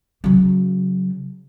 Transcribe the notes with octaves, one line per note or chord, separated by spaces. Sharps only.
C#3 F#3